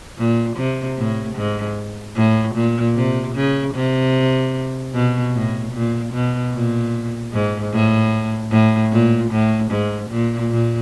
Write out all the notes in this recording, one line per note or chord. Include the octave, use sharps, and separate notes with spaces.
A#2
C3
A2
G#2
A2
A#2
C3
C#3
C3
B2
A2
A#2
B2
A#2
G#2
A2
A2
A#2
A2
G#2
A#2
A#2